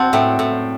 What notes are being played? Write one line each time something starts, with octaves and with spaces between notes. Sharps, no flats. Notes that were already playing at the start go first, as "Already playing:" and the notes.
Already playing: C4 F#5 A5
A2 E5 G5
A2